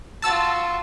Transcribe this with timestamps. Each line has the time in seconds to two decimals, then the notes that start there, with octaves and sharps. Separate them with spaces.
0.22 F4 F#4 A5 E6 A6